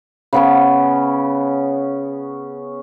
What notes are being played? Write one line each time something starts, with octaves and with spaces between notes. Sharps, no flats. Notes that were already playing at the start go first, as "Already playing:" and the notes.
C#3 B3 C#4